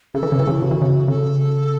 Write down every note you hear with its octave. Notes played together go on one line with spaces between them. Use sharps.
C#3 A4
E3
C#3
E3
C#3 E4
C#3 F#4
E3
C#3
C#3 A4